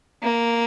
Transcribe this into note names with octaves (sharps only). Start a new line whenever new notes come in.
A#3